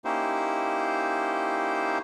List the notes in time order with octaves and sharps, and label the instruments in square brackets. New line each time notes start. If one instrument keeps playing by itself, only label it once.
[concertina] A#3 C#4 D#4 E4 G4 C5